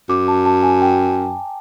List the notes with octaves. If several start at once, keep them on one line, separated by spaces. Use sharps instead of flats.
F#2 D6
A5
A5
G#5
G5